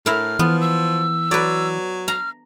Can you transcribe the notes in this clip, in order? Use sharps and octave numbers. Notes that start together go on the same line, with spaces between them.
A2 E4 A#4 F6
E3 F3 B3
E6
F#3 B4 D5
A#5 F6